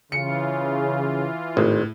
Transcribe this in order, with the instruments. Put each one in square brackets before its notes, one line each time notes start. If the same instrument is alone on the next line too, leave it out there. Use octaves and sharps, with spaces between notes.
[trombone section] C#3 [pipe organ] E3 F4 [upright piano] C#7
[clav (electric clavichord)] G#1 [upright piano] A2